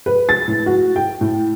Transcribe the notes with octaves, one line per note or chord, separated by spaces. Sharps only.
B4
A6
A2
F#4
G5
A2